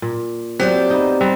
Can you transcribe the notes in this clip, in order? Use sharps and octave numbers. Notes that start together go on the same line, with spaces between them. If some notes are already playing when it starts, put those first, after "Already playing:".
A#2
F#3 C4 G4 C5 D5
B3 D#4
G3 C4